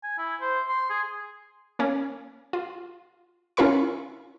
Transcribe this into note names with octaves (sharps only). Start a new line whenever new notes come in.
G#5
E4
C5
C6
G#4
A#3 C#4
F4
C#4 E4 F4 A#4 B5 C#6